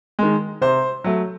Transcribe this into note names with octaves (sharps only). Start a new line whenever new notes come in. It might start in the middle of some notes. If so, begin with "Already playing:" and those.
D#3 G#3
C3 C5
F#3 A3